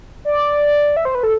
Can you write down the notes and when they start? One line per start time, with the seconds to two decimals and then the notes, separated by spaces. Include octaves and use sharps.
0.25 D5
0.97 E5
1.05 C5
1.15 B4
1.23 A4